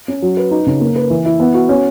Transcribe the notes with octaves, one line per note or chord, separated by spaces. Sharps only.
C#4
F#3
B4
D#4
C#3
A#3
B4
E3
E4
B3
F#4
C#4